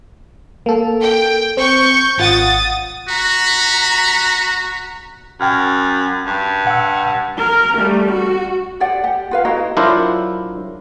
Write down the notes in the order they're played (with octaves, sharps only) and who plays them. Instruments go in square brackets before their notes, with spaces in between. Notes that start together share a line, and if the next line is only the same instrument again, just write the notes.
[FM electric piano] A#3 A4
[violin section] G5
[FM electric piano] C4 [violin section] C#6 G6
[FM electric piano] G#1 F4 F#5 [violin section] D#6 A6
[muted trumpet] F#4 [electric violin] A#5 B6
[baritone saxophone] F#2 [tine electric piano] G5 F6
[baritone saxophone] G2
[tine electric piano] F#5 E6
[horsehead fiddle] A#4
G3 A3
F#4
[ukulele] G4 C5 D5 F#5
G4 F#5
F4 B4 F5
E4 F#4 D#5 A#5
[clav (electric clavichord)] F#3 D4 E4 F4 A#4 C5